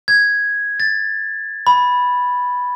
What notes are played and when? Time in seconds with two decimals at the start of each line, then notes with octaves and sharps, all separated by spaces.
0.08 G#6
0.80 A6
1.67 B5